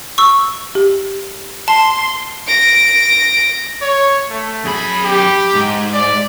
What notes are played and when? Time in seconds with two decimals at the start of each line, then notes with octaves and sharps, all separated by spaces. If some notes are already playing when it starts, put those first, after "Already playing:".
0.18 C#6 E6
0.75 G4
1.68 A5 C6
2.47 A#6 D7
3.82 C#5
4.30 A3
4.65 F#2 G#4 B5
5.04 G4
5.54 G#2
5.94 D5